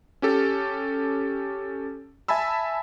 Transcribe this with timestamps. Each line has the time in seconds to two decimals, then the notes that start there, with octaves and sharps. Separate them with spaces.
0.22 C#4 G4 A4
2.28 E5 G#5 A5 B5 E6